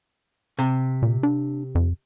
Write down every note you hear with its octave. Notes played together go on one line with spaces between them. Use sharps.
C3
A#2
D4
F2